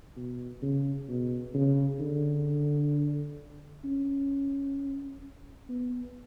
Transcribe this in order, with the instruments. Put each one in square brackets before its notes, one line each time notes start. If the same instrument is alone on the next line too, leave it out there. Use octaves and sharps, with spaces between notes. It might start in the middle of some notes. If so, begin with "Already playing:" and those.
[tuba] B2
C#3
B2
C#3
D3
C#4
B3